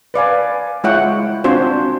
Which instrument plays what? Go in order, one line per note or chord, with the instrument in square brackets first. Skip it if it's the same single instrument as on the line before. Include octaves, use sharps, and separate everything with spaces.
[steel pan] B4 D5 F5 G#5
G#3 E4 F4 C#5 F#5 G5
C4 D4 F4 F#4 C5